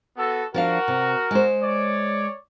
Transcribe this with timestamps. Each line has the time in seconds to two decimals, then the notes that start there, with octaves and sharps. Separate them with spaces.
0.17 B3 F#4 A4
0.54 F3 D4 F#4 A#4 F5
0.88 C3
1.31 G#3 C5
1.62 C#5 D5